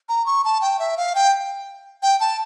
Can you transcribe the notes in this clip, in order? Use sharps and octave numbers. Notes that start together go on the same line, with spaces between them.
A#5
C#6
A5
G5
E5
F5
G5
G5
A5